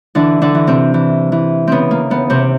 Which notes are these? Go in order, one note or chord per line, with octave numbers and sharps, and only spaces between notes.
D3 E3 D4
D3 D4
E3
C3 C4
E3
E3
C#3 B3 C4
A#3
D#2 B3
C3 C4